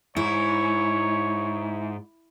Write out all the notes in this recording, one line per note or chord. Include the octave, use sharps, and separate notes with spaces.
G#2 E4 C#5